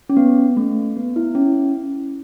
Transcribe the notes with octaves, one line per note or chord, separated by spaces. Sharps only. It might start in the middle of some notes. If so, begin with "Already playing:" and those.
C#4
B3
A3
B3
E4
C#4